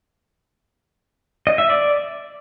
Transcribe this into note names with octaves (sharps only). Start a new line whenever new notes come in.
D#5
E5
D5